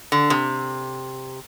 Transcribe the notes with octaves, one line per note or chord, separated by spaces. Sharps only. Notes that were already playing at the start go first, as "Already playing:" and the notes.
D3
C3